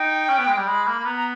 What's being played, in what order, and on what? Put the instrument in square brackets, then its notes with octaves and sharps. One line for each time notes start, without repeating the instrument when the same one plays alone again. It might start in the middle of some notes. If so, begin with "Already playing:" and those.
Already playing: [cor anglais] D#4 [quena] G5
[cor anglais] C#4
B3
G#3
G3
[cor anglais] G#3 [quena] B5
[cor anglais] A#3 [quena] B5
[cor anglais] A#3
[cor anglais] B3 [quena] A#5
[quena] A#5